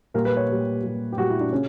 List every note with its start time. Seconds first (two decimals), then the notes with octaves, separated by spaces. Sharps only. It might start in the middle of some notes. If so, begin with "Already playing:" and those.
0.14 A#2 G3 A#4
0.25 B4
0.37 C#5
0.49 A#2 G3
0.84 A#2 G3
1.12 G4
1.17 A#2 G3 F#4
1.29 E4
1.41 D4
1.52 C#3 C#4